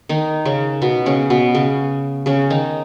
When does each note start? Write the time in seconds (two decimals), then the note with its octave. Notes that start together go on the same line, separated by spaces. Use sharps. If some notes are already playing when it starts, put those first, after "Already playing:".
0.09 D#3 D#4
0.45 C#3 C#4
0.82 B2 B3
1.06 C#3 C#4
1.30 B2 B3
1.55 C#3 C#4
2.26 C#3 C#4
2.50 D#3 D#4